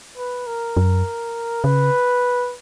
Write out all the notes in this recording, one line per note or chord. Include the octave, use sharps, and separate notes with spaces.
B4
A#4
F#2
C#3 B4